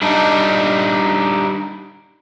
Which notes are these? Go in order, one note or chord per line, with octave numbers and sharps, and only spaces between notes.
G3 D4 D#4